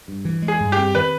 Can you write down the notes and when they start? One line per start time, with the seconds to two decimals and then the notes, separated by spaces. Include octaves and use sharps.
0.08 G2
0.25 E3
0.42 G#3
0.48 G#4
0.60 G2
0.72 G4
0.78 C4
0.95 D#3 B4